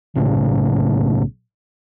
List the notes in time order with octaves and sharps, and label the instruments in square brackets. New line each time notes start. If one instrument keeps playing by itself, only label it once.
[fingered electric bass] B1 A2 C#3